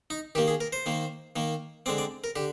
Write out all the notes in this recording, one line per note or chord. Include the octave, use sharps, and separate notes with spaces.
D#4
D#3 A#3 G4
G#4
A#4
C5
D#3 A#3
D#3 A#3
D3 G#3 C4 D5
D5
A#4
D3 G4